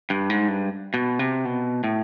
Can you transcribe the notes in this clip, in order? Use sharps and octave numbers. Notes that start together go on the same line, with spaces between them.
G2
G#2
G2
B2
C3
B2
A2